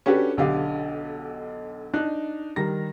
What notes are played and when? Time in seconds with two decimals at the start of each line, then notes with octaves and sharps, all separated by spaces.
0.06 C#4 D4 F#4 G4 A4 B4
0.37 B1 D3 G4 D#5 F5 D6
1.93 D4 D#4 F#6
2.56 D#3 G3 A#5 A#6